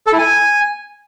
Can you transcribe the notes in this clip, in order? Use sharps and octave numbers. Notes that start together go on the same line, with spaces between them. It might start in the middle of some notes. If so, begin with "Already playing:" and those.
A4
E4
G#5